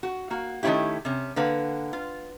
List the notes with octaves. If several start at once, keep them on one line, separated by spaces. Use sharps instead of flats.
F#4
A#3 F#4
D#3 A3 C4 C#4 E4 G4
C3 C#4
D3 A#3 B4 F#5
F4